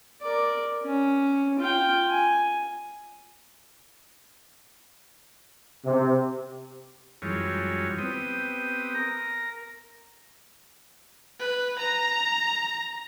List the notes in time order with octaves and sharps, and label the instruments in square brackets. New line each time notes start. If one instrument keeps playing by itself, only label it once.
[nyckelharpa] A#4 D5
C#4
F4 G5
G#5
[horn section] C3
[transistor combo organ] F#2 E3 G3 G#3 F4 C#5
B3 C4 G4 D#6
A#4 A#5
[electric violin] B4
A#5